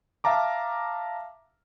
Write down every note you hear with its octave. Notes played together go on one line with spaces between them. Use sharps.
E5 F5 A5 A#5 D6